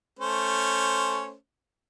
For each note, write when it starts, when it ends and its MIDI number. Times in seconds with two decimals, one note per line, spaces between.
0.19 1.34 57
0.19 1.34 61
0.19 1.34 72